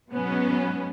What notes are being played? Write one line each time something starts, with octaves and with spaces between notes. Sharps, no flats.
G#2 B2 F#3 B3 C#4